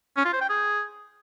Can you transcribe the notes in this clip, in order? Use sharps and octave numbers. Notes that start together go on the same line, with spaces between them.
C#4
F4
C5
G5
G#4